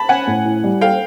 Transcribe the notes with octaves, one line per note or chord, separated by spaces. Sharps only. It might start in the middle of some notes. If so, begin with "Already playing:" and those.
Already playing: A5 B5
C#4 F#5 G#5
A2
E4
G3
A4 F5 G5